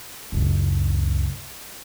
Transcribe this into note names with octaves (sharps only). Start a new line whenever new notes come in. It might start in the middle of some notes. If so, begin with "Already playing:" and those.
C#2 F#2